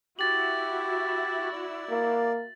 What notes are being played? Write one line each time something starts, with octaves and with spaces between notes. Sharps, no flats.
E4 F#4 G4 A6 F#7
D5
A#3